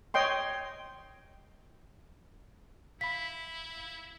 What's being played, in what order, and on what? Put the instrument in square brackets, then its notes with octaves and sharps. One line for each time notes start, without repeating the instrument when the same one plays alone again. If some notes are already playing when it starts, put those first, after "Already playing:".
[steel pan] C#5 D#5 G5 C6
[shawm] E4 [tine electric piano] F5 B5 [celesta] B6